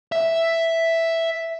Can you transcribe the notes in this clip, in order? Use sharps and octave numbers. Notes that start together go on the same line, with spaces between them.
E5